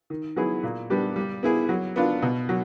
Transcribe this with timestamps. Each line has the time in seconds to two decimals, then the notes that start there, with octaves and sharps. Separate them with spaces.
0.10 D#3
0.36 F#3 B3 E4 G#4
0.63 A#2
0.90 G3 B3 D4 G4
1.16 G3
1.43 B3 E4 G#4
1.69 F#3
1.96 B3 D4 F4
2.22 B2
2.49 F#3